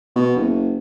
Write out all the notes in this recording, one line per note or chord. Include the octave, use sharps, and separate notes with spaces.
B2
F#1